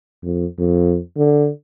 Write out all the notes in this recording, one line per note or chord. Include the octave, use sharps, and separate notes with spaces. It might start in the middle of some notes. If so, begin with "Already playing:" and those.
F2
F2
D3